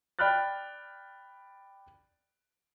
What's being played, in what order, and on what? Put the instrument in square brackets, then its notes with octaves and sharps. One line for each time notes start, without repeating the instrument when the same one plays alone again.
[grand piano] D5 G5 B5 F6 F#6 A6